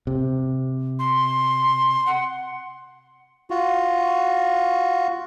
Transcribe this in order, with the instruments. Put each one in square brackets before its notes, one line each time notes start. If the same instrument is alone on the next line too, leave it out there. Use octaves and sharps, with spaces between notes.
[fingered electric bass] C3
[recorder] C6
F#5
[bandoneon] F4 F#4